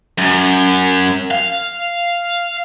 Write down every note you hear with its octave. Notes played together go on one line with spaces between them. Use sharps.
F#2
F5